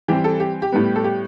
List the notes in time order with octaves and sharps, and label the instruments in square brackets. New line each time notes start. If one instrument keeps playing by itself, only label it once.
[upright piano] E3 G3 C4 G4
A4
G4
G4
A2 G3 B3
A4
G4